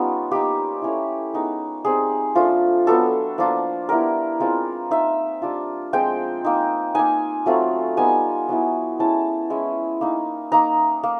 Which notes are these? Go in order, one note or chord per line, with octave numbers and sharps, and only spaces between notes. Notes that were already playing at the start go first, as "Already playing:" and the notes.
Already playing: G3 B3 C#4 D#4 F4
A#3 D#4 G4
A3 C#4 E4
G#3 B3 D#4
G3 C4 D#4 G#4
F3 A3 D4 F4
F#3 B3 D4 A4
F3 A#3 D4 F4
G3 B3 E4 A#4
G#3 C4 F4
A#3 D#4 E5
G3 A#3 D4 F4
F3 G#3 C4 G5
A#3 D#4
A#3 D#4 G#5
F#3 A3 C4 F4
G3 B3 D#4 G#5
F#3 B3 E4
G#3 C#4 E4 A5
G#3 C#4 E4
A#3 D#4
A#3 D#4 A#5
A#3